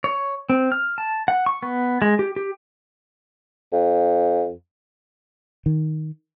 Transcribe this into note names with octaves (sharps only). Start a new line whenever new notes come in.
C#5
C4
F6
A5
F#5
C#6
B3
G#3
G4
G4
F2
D#3